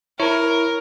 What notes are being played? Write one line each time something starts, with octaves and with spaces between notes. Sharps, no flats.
E4 A#4 C#5